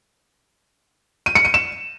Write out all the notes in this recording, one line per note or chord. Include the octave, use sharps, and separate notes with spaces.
D#7
C#7
D#7
E7